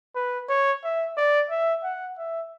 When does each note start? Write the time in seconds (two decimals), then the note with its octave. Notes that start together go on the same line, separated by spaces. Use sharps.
0.16 B4
0.49 C#5
0.84 E5
1.17 D5
1.50 E5
1.83 F#5
2.18 E5